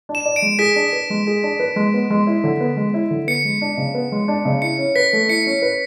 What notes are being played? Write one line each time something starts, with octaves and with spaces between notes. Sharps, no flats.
D4
E7
D5
D7
G#3
G#4 B6
D4
B4
G#3
G#4
D4
B4
G#3
B3
G#3
E4
D3
B3
G#3
E4
D3
B3 C#7
G#3
D4
C#3
B3
G#3
D4
C#3
E4 C#7
C#4
B4 B6
A3
E4 C#7
C#4
B4